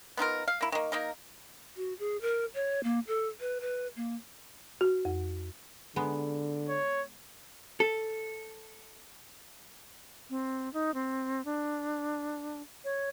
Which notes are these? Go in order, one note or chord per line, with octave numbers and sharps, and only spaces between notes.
B3 D#4 F4 A#4
F5
A#3 E4
D#3 A#3
A#3 D#4 A#4
F#4
G#4
A#4
C#5
A#3
A4
B4
B4
A#3
F#4
F2
D3 G#3 B3 D#4
C#5
A4
C4
D#4
C4
D4
C#5